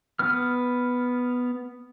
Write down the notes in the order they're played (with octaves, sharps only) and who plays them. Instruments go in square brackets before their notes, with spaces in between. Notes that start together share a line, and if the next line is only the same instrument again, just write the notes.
[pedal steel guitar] B3 F6